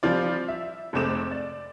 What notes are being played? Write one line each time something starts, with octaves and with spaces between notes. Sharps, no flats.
F3 G3 C4 F4 D5
E5
F1 G#3 A3 C4 D6 E7
D5